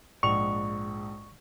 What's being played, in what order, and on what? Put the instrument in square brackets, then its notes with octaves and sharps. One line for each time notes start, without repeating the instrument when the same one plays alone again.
[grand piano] A#1 G#2 F7 [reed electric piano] C#6